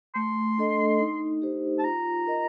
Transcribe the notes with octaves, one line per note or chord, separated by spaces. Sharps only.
A3 C6
D4 A4 D#5
D#4
G4 C5
A5
F4 A#5
A#4 D#5